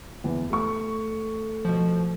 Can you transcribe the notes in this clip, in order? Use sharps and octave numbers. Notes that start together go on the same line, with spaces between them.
E2
A3 C#6
B2 F3